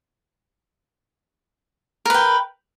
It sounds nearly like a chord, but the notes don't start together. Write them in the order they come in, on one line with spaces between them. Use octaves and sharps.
A#4 B4 G5